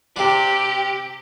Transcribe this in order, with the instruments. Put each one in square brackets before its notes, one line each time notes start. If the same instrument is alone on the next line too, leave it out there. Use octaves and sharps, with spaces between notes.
[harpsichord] C3 D4 [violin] G4